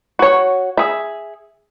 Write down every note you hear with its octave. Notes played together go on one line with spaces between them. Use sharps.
F#4 C#5
G#4 E5